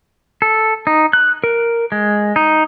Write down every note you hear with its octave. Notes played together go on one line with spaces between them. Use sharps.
A4
D#4
F#6
A#4
G#3
D#4